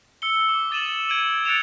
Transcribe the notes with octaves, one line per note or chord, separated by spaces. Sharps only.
E6 C#7 G7
D6
D#6 A6 D#7 E7 F#7
G#6 D7 D#7 F#7
F#6 A6 C#7 D7 E7 F7